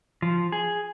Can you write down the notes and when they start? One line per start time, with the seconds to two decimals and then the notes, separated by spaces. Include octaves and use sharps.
0.22 F3
0.52 G#4